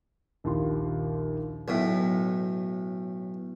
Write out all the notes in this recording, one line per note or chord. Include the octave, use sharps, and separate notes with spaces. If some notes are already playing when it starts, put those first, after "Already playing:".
A#1 D#2 F3 E4 G4 C6
B1 A2